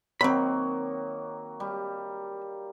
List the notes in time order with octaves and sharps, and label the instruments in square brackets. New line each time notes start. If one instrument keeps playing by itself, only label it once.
[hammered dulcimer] D#3 F#3 A#3 [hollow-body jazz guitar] C4 B5
[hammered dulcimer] G3